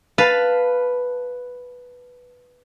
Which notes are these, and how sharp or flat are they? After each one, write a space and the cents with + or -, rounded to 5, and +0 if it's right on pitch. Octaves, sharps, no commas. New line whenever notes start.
B4 +0 F5 +0 A5 +0